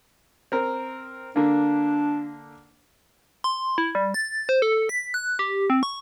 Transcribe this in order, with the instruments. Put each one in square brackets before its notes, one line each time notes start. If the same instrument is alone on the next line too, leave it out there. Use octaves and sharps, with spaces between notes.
[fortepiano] C4 A#4
[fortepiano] D3 A#3 [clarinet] D4
[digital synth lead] C6
E4
G3
A6
C5
A4
B6
F#6
G4
C4
C#6